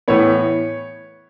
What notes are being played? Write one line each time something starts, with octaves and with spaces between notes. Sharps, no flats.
A2 E3 B3 C#5